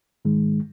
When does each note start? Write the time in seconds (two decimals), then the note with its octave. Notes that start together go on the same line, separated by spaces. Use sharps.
0.25 G#2 D#3 G#3